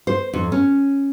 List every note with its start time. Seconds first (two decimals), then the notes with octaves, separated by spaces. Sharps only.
0.07 C5
0.33 F2
0.52 C#4